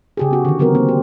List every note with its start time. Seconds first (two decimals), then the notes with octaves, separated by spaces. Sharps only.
0.17 C#3 G4 G#4
0.31 B3 F#4
0.45 D3 D#3
0.59 C#3 F#3 B3 C4 F#4 A#4
0.75 A#3 C4
0.89 G4